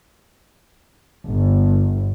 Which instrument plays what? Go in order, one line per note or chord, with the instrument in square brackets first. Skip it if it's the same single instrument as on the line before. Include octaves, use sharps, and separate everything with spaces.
[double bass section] G1